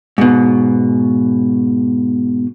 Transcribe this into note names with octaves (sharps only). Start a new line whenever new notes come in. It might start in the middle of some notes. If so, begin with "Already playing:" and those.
G#2 B2